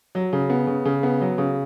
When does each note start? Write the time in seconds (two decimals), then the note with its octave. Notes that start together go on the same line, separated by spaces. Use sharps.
0.15 F#3
0.33 C#3
0.50 B3
0.67 C#3
0.85 C#3
1.03 B3
1.21 F#3
1.38 C#3